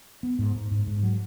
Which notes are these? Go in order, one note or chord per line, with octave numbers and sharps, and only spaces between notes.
B3
G#2
G#2
G#2
G#2
F#3